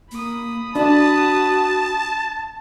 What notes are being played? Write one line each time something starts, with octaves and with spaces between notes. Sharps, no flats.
A#3 B5 D#6
D4 F#4 A5